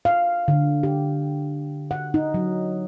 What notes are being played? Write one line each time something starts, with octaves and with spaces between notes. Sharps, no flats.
F5
D3
G4
F#5
D#4
F#3